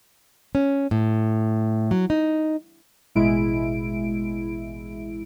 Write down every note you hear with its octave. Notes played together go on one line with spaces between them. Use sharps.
C#4
A2
F#3
D#4
A1 B2 G#3 E4 D7